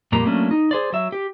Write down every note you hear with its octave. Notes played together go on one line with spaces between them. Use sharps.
F2 A#2 G3 A#3 A#5
F#3 A3 A#3 C#4 D4
D#4
G#4 C5 D5
F#3 E5
G4